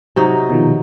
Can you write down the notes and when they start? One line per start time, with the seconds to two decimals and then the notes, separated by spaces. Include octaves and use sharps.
0.16 C3 F#3 D#4
0.50 B2 D#3 F3